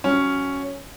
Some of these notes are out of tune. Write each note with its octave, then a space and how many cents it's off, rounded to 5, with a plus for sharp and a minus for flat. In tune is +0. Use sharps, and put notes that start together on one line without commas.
F#3 +0 C#4 +0